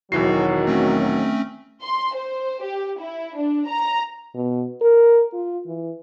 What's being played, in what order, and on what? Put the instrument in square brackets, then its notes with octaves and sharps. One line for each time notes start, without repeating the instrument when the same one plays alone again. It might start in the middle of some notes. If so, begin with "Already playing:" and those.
[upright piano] E1 E3 C7 [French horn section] D#3 F#3 [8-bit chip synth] F#4
[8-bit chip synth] A3 C4 C#4
[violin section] C6
C5
G4
E4
D4
A#5
[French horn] B2
A#4
F4
E3